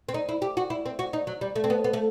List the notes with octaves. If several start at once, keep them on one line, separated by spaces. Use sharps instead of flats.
C4
D#4
E4
G4
F#4
E4
C4
F#4
D#4
F#3
G3
A3
C4
B3
B3
A3